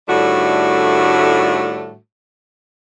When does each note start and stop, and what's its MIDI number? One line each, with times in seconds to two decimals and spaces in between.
0.08 1.96 45
0.08 1.96 51
0.08 1.96 55
0.08 1.96 57
0.08 1.96 62
0.08 1.96 66